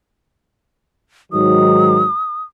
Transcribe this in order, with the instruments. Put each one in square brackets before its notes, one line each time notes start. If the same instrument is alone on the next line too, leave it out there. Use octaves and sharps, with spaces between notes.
[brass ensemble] G#2 D#3 F#3 [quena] D#6